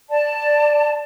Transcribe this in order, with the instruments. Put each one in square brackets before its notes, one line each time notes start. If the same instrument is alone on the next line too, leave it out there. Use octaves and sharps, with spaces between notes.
[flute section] D5 A5